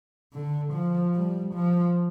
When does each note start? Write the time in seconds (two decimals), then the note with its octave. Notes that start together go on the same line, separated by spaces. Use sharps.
0.33 D3
0.73 F3
1.14 G3
1.54 F3